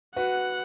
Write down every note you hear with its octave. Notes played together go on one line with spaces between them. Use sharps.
F#4 B4 F#5